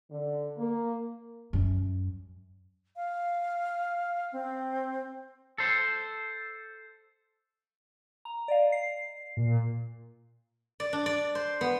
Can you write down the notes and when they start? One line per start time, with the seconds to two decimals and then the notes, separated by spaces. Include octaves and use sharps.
0.10 D3
0.57 A#3
1.53 F#2
2.96 F5
4.32 C4
5.58 A4 C5
8.25 A#5
8.48 D5 D#5 F5
8.72 C7
9.37 A#2
10.80 D5
10.93 D4
11.06 D5
11.35 C5
11.61 B3